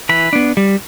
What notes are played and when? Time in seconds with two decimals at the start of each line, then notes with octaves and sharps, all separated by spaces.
0.09 E3 B5
0.33 B3 D4
0.57 G3